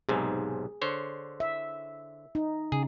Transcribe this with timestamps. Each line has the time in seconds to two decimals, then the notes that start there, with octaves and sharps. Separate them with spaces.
0.09 B1 G#2 C3 G#4
0.82 D3 C5 C#5
1.40 E5
2.35 D#4
2.72 C#3 G#4